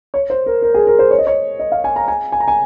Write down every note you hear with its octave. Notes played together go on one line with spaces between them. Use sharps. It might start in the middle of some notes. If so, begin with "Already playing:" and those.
C#5
C5
A#4
A#4
G#4
A#4
C5
C#5
D#5
C#5
D#5
F5
G#5
A#5
G#5
G#5
A#5
G#5